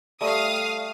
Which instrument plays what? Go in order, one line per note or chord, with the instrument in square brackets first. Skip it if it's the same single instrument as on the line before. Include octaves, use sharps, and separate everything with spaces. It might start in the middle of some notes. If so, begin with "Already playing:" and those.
[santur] G3 A3 [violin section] F5 D#6